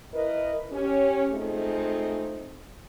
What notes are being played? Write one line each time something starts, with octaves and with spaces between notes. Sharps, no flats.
E4 A#4 B4 D#5
C#4 G4
G#3 A3 C4 D#4 F4 G#4